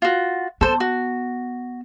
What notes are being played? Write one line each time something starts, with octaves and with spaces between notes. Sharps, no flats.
F4 F#4
B3 A4 C5
F#4